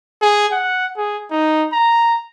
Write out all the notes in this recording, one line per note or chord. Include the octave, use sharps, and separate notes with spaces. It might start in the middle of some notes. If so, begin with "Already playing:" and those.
G#4
F#5
G#4
D#4
A#5